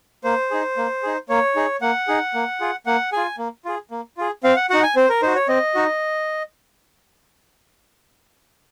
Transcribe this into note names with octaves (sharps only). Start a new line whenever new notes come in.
A#3 C5
D#4 G#4
A#3
D#4 G#4
A#3 C#5
D#4 G#4
A#3 F#5
D#4 G#4
A#3
F4 G#4
A#3 F#5
F4 G#4 G#5
A#3
F4 G#4
A#3
F4 G#4
C4 F5
F#5
D#4 F#4 F#5
G#5
C4 C5
A#4
D#4 F#4 C5
C#5
C4 D#5
D#4 F#4